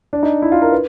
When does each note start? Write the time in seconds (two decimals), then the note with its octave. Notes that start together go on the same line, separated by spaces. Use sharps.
0.13 D4
0.23 D#4
0.42 E4
0.52 F4
0.62 A#4
0.72 B4